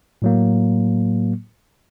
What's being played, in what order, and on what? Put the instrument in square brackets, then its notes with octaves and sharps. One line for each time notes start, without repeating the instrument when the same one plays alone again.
[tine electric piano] A2 F#3 A#3